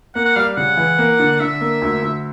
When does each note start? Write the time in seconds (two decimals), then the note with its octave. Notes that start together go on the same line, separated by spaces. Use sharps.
0.15 A#3 F#5
0.26 F#5
0.36 G3 F5
0.57 C#3 F#5
0.77 E3
0.98 A#3
1.19 D3
1.40 D3 E5
1.61 A#3
1.82 D2
2.02 D2